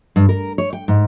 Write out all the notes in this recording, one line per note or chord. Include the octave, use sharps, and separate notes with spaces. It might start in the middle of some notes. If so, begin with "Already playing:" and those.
G2
A#4
C#5
G5
G#2